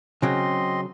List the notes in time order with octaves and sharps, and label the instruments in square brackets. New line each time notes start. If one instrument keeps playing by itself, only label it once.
[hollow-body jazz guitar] C#3 F#3 [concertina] C4 D#5 C6